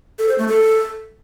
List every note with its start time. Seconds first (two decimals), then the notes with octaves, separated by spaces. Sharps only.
0.19 A4
0.29 C5
0.38 A3
0.48 A4